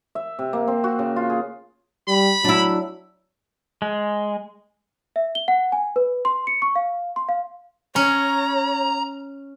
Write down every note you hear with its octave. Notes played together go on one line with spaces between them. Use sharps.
E5
C3
A#3
C4
F#4
C#3
F4
G#4
G3 B5
F#3 D4 E4
G#3
E5
G7
F#5
G#5
B4
C6
C#7
C#6
F5
C6
F5
C#4 C#5 A#5